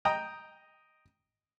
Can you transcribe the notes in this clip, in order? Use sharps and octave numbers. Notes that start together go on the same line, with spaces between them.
D#5 G5 A#5 D#6